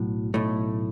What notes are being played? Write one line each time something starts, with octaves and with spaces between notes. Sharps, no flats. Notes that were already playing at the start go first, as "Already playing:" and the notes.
Already playing: B1 A2 F#3
B1 A2 A3